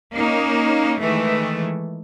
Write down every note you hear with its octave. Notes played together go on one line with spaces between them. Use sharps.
A#3 C#4 D#4
D#3 E3 G#3 A3